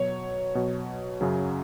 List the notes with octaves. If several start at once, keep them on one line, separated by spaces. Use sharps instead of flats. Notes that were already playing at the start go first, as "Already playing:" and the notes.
Already playing: B2 F#3 C#5
B2 F#3
F#2 C#3 F#3